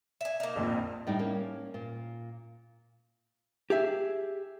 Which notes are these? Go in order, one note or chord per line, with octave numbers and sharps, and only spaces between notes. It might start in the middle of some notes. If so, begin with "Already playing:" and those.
E5 G#5
A#3 D#4
A#1 F2 A#2
A2 G3 D4 D#4
A#3 C#4
A#2
G4 G#4 E5